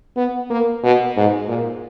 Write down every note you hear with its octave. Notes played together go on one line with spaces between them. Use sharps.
B3
A#3
B2
G#2
A#2